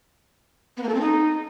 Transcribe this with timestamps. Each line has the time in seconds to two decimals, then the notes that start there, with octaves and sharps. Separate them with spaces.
0.77 B3
0.83 A#3
0.89 A4
0.95 C4
1.00 D#4